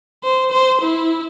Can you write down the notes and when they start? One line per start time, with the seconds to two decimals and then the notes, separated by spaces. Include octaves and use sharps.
0.24 C5
0.52 C5
0.81 E4